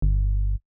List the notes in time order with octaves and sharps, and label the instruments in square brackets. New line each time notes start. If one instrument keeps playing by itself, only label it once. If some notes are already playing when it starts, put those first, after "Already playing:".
[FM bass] G1